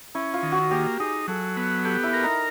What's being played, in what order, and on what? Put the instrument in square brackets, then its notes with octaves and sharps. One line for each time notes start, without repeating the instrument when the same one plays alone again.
[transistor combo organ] C#4 [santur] E4
[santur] F4
[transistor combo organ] D#3
[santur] F#4
[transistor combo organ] A#3 [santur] G4
[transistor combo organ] D#4 [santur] G#4
[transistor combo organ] F#3 [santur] A4
[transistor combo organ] B3
[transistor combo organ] G4 [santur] A4
[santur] E4
[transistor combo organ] A#4
[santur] D#4